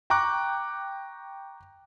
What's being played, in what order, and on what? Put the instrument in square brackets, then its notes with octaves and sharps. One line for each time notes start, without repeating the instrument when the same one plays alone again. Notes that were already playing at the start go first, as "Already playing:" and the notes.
[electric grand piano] G5 A#5 C#6 D6 F#6